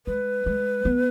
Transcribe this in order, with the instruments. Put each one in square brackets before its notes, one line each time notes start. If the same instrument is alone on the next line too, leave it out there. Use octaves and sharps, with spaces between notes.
[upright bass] G#3 [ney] B4
[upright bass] G#3
B3